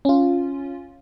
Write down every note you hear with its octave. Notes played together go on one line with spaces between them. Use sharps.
C#4 F4